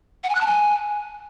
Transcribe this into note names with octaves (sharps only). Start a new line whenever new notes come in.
F#5
G#5
F#6
A5
G#5